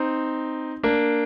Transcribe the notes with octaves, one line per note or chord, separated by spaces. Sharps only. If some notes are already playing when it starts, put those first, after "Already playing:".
Already playing: C4 D#4
A#3 D4